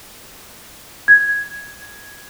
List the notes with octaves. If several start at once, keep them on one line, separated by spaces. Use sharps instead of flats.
G#6